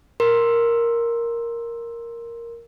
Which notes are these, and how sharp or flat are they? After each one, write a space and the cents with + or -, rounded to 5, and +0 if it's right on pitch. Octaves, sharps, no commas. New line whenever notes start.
A#4 +0 C6 +5